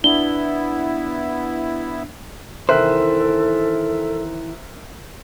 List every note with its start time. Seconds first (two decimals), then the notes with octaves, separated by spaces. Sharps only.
0.04 B3 D4 E4 G7
2.69 C3 D#3 E3 A4 A#4 C5 E5 F#6